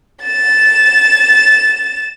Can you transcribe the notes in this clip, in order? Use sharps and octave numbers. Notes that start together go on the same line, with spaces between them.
A6 E7